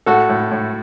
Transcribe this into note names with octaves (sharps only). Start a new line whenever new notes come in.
A2 F#4 A4
A2
A2